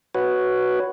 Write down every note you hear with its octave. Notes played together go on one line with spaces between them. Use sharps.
F#4 B4 C#5